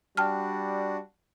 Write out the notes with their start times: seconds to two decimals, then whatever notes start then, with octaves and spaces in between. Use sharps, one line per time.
0.17 G3 D4 F#4 G5 A5 F6